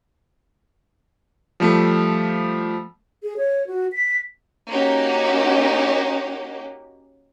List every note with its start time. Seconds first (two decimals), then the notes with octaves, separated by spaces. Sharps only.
1.60 F3 G3 A3
3.23 G#4
3.37 C#5
3.67 F#4
3.93 B6
4.69 A#3 C#4 D#4 F#4 G4